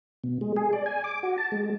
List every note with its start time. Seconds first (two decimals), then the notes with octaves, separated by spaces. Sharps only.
0.24 B2
0.41 G#3
0.56 G#4
0.73 D5
0.86 G#5
1.04 D6
1.23 F#4
1.38 A5
1.52 G#3